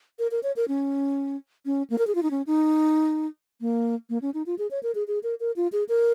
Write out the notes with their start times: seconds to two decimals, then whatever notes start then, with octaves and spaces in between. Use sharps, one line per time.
0.19 A#4
0.31 A#4
0.43 C#5
0.56 A#4
0.68 C#4
1.66 C#4
1.90 A#3
1.98 A#4
2.07 G#4
2.15 F4
2.23 D#4
2.31 C#4
2.47 D#4
3.61 A#3
4.10 A#3
4.22 C#4
4.34 D#4
4.46 F4
4.58 G#4
4.71 C#5
4.83 A#4
4.95 G#4
5.08 G#4
5.23 A#4
5.40 A#4
5.56 F4
5.72 G#4
5.89 A#4